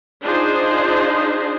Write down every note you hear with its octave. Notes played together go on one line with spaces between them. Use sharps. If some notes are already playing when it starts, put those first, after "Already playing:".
D4 D#4 F4 G#4 C5